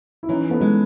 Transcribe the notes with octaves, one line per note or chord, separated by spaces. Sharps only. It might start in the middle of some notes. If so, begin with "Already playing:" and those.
E4
E3 C#4 D#4
A3 B3
G#3